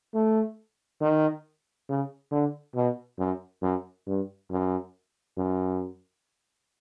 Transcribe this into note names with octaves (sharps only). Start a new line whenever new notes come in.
A3
D#3
C#3
D3
B2
F#2
F#2
G2
F#2
F#2